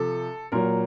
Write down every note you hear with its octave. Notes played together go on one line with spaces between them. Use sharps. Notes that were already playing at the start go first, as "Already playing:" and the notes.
Already playing: C3 F3 A4
A#2 F#3 A#4